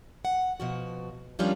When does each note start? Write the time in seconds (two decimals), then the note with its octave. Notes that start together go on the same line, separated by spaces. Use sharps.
0.25 F#5
0.60 B2 F3 F#4
1.39 D#3 F3 G3 C#4 D4 F4